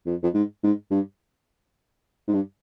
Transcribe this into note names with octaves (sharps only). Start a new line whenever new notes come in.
F2
F2
G#2
G#2
G2
G#2
G2